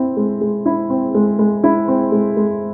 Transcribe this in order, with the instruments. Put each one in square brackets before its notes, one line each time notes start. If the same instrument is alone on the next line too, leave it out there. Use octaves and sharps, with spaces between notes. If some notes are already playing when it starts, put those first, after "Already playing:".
Already playing: [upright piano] C4 E4
G#3
G#3
E4
C4
G#3
G#3
E4
C4
G#3
G#3